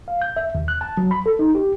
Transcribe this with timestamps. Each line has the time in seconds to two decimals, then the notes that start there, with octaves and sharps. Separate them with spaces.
0.08 F5
0.22 G6
0.37 E5
0.55 D#2
0.68 F#6
0.81 A5
0.97 F#3
1.11 B5
1.26 A4
1.39 D#4
1.55 G4